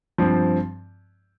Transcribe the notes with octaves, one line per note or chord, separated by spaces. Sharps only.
G2 F3 C4